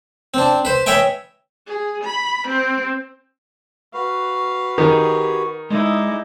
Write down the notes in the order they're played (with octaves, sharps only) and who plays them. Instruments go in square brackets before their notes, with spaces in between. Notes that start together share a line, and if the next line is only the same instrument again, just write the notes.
[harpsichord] C4 D4
B4 C5
B4 C#5 D#5 E5 G5 G#5
[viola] G#4
B5
C4
[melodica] F#4 B4 [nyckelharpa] F5
[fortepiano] D#3 [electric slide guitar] G4 G#4
[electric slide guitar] G#3 [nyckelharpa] D#4 E4 [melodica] G#4 D5